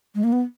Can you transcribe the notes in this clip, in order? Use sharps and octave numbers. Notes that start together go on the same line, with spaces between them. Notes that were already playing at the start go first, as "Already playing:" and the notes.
G#3
A#3
B3